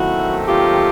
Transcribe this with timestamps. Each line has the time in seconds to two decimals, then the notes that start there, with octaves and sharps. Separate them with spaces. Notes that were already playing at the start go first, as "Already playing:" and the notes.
Already playing: D#2 D#3 F#3 A3 C4 E4 F#4
0.47 F4 G4